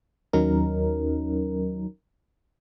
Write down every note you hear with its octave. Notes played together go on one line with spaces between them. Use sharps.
D#2 F#3 C#4 D#4 A#4